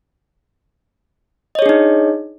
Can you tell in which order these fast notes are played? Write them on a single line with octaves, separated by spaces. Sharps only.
D#5 C#5 G#4 D4 D#4